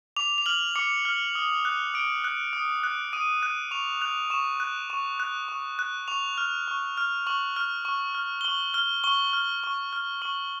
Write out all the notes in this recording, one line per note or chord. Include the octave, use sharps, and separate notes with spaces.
D6 F7
F7
F6 F#7
D6 C#7
F6
D#6
F#6
D#6 D7
F#6
D#6
F#6
D#6 D#7
F#6
C#6 F7
F#6 F7
C#6 E7
F#6
C#6
F#6
C#6
F#6
C#6 F7
F6
C#6
F6
C#6 F#7
F6
C#6
F6
G7
C#6 F#7
F6 G7
C#6 G7
F6
C#6
F6
C#6 F#7